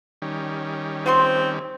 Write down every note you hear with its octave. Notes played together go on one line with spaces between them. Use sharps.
D#3 G3 C#4
C4 F4 F#4 C6